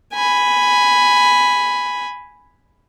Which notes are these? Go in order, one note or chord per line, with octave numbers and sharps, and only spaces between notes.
G#5 B5